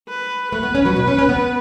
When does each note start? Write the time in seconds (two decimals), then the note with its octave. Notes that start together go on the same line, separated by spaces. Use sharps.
0.09 B4
0.52 A3 B4
0.63 B3
0.75 C#4
0.85 F#3
0.96 B2
1.08 C#4
1.18 C#4
1.29 B3